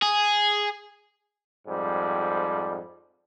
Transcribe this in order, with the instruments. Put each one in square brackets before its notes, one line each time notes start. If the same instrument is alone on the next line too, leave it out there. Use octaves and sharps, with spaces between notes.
[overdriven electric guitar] G#4
[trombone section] F2 G#2 G3